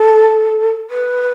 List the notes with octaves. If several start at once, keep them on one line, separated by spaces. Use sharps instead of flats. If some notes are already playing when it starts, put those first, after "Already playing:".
Already playing: A4
B4